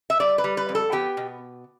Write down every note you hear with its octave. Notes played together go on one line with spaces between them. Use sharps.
E5
G3 D5
B4
G3
B4
F2
A4
B3 G4
B2